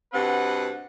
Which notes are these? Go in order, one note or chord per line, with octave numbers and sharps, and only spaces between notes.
G2 B2 B3 C4 B4 F#5